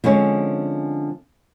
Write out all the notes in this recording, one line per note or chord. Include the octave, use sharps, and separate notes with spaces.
D3 F3 G#3 C4 C#4